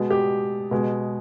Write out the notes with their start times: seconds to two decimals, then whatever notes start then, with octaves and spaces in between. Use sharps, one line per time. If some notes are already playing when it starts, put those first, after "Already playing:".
Already playing: B2 G#3
0.10 G4
0.71 B2 G#3